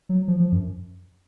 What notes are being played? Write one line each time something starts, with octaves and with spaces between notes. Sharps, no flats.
F#3
F3
F3
F#2